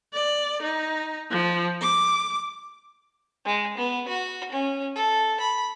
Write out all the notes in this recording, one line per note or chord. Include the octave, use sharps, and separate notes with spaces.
D5
D#4
F3
D6
G#3
B3
F#4
C#4
A4
B5